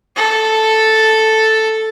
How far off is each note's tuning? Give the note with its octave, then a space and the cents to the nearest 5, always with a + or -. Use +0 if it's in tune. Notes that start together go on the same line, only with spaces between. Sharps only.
A4 +0